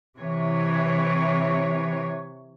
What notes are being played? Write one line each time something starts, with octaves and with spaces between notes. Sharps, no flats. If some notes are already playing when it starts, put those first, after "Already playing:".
C3 E3 C#5